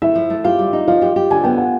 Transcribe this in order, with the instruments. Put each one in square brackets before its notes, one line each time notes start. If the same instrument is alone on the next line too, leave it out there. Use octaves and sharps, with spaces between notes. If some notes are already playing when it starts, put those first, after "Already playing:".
[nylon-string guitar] A3 [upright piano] E4 E5
[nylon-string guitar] F3
A3
[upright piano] F4 F5 [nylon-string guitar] G4
[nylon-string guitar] G3
D#4
[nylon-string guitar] F3 [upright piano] F4 F5
[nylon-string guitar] G4
G4
[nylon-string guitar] D3 [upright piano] G#5
[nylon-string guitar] B3 [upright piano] G5
[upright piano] F#5